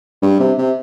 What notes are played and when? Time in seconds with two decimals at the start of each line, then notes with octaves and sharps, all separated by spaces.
0.22 G2
0.40 C3
0.58 C3